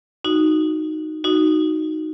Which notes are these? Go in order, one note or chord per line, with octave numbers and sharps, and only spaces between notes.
D#4 F#4
D#4 F#4